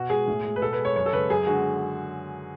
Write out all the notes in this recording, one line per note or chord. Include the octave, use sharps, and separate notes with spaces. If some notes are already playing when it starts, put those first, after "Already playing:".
Already playing: B2 F#4
G#3 G#4
A2
G#3
B4
B2 A4
B4
G#3
C#5
F#2 C#5
A4
C#3 G#3 B4
F#2 G#4
D3 G#3 F#4